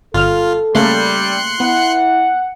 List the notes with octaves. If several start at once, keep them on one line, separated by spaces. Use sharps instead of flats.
G1 F4 A4 F6
C#3 G3 A3 A#3 C6 F#6 C#7
B3 E4 F#5